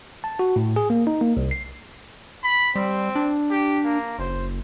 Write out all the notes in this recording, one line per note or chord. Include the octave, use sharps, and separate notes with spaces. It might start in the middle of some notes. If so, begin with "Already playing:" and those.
A5
F#4
A2
G#4
A#3
D#4
A#3
C2
C7
B5
G3 C4
D4
G4
A#3
F#1 C5